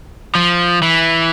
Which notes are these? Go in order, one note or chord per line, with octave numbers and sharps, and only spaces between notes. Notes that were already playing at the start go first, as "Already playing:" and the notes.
F3
E3